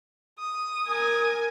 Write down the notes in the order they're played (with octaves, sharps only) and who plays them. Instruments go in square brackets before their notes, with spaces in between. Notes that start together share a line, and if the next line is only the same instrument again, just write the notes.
[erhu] D#6
[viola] A#4 G#5